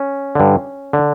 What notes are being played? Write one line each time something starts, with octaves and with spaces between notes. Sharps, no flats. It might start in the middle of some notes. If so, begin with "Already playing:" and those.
Already playing: C#4
G2 D3
D3